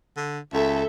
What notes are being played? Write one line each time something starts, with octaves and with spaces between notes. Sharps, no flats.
D3
C#2 A4 E5